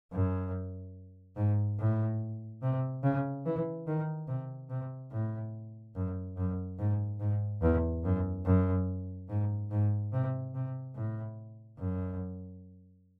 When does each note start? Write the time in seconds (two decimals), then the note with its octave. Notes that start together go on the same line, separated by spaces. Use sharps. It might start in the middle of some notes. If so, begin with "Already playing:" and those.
0.12 F#2
1.36 G#2
1.79 A2
2.62 C3
3.03 C#3
3.45 E3
3.87 D#3
4.28 C3
4.70 C3
5.11 A2
5.95 F#2
6.37 F#2
6.79 G#2
7.20 G#2
7.62 E2
8.04 F#2
8.45 F#2
9.29 G#2
9.71 G#2
10.13 C3
10.54 C3
10.95 A2
11.78 F#2